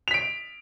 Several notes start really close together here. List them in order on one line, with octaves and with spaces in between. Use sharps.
F7 B6 D7